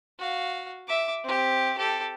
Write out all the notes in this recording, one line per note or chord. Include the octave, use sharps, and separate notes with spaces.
F#4 F5
E5 D6
C4 G4
G4 A4